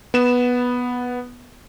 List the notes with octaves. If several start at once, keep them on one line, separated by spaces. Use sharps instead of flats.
B3 E7